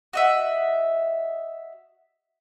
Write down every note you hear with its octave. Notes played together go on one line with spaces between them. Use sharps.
F#4 D#5 E5